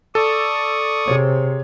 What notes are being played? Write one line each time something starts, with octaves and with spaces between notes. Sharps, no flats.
A4 D5 C#6 D#6
C3 G#4 C5 C#5